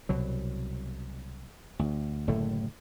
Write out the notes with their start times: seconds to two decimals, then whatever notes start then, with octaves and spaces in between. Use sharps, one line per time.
0.09 C2 B2 F#3
1.79 D2
2.27 F#1 A2 D3 A3